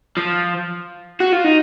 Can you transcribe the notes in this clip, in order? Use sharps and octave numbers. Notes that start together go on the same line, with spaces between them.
F3
F#4
F4
D#4